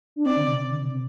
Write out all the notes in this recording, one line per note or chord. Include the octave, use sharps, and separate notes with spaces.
D4
C4 D5
D3
C3
D3
C3
C3